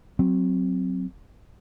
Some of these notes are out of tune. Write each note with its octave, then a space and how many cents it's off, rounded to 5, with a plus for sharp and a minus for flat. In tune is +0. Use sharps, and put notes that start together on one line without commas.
F#3 +0 C4 +0